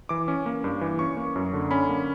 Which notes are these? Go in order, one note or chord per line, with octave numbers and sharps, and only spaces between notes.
E3 D6
C#4
A#3
G2
E3
C#4 C#6
A#3
F#2
D3
C#4 B5
A#3